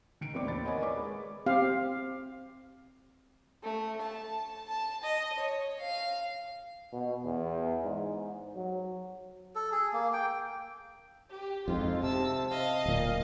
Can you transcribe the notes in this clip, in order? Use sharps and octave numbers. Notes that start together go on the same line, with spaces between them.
D#3 C#7 D7
A1 B3 C4 E4 D5 D6
D#2 B5 A6
A#4 C#5 D#5 F#5 G#5 B5
B4 D5 B5 D6
G#3
C4 G4 F5
A3
A5
A5
D#5
C#5
F5
B2
E2
G#2
F#3
A4
G#4
A#3
G5
G4
F2 G#2 F4
C3 A5 E6
D#5 F5
D1 A#2